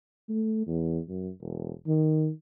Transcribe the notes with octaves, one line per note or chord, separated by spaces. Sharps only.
A3
E2
F#2
E1
D#3